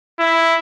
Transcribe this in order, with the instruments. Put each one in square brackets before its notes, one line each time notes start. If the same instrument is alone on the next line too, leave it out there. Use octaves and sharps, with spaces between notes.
[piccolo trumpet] E4